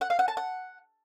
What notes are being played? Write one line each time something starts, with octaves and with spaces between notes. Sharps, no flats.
F#5
F5
F#5
A5
F#5